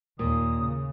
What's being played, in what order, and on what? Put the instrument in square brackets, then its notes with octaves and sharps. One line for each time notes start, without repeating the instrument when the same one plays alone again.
[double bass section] D#2 [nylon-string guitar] A#2 [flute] D#6
[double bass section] C#3